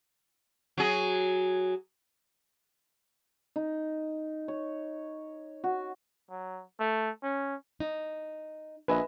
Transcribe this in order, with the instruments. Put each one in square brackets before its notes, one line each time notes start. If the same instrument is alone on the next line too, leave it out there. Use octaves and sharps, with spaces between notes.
[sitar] F#3 G#4
[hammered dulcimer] D#4
C#5
F#4
[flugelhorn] F#3
A3
C#4
[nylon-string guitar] D#4
[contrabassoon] A#1 [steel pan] B4 [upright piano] D#5 E5 G#5